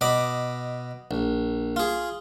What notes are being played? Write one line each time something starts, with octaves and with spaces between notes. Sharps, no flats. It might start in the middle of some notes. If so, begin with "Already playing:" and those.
B2 D#5 B5 D6
A#1
F4 G#4